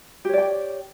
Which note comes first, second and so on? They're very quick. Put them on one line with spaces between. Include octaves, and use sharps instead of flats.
G4 C#5 D5 G5